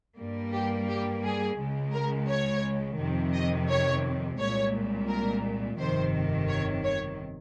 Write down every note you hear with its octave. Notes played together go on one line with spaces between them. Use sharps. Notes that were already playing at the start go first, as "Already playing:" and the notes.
G2 G3 A#3
G4
G4
G#4
C#2 C#3 G#3
A#4
C#5
F2 C3 D#3
D#5
C#5
C2 A#2 G#3 C#5
A#4
G1 F2 C3 D#3 C5
C#5
C#5